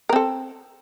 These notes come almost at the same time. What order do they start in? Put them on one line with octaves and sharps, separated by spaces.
A#4 C4 A4